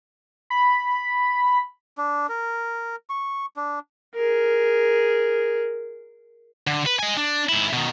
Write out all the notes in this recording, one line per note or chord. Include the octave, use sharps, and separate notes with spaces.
B5
D4
A#4
C#6
D4
G#4 A#4
D3
B4
D#5 G#5
D4
G#2 E4
B2 D#3